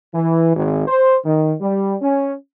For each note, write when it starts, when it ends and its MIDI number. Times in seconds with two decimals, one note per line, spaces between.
0.14 0.54 52
0.55 0.85 32
0.88 1.16 72
1.25 1.54 51
1.61 1.96 55
2.02 2.34 61